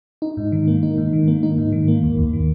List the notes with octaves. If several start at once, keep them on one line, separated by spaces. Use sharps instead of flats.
D#4
G#2
D#3
A#3
D#4
G#2
D#3
A#3
D#4
G#2
D#3
A#3
D#2
D#2
D#3